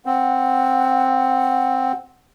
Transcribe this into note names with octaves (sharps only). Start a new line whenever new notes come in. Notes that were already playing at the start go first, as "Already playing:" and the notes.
C4 F#5